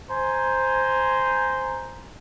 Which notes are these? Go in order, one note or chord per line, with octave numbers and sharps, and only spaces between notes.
C5 G#5 A#5